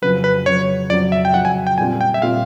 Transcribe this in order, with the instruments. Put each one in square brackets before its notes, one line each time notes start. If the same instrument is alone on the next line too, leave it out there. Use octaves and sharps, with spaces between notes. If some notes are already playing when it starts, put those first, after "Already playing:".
[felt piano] F2 C#3 F#3 [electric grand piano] B4
[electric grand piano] B4
[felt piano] F2 C#3 F#3 [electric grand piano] C#5
[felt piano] F2 C#3 F#3 [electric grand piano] D5
[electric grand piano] E5
G5
[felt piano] F2 C#3 F#3 [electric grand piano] F#5
[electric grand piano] G#5
G5
[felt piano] A#2 G3 C4 F4 [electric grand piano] G#5
[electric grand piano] G5
E5
[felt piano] A#2 G3 C4 F4 [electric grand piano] F5